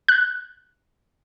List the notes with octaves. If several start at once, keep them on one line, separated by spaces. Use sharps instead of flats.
F#6